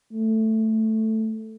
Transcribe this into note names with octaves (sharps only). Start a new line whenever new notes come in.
A3